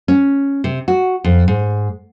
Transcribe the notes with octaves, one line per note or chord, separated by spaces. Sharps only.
C#4
C3
F#4
F2
G#2